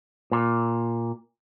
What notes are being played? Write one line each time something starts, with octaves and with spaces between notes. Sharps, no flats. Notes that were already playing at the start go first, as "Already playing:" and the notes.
A#2